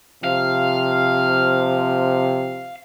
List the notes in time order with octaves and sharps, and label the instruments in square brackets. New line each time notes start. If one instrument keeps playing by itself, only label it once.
[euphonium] C3 [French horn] F3 [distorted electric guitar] F5